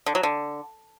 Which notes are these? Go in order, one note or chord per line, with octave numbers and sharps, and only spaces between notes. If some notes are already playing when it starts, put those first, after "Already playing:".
D3
F#3
D3